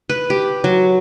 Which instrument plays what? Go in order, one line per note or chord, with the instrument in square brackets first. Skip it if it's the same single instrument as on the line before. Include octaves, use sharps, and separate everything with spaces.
[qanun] B4
G4
F#3